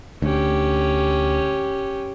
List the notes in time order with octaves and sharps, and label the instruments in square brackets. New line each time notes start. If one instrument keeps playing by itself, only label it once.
[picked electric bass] D2 [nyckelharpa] C#4 G4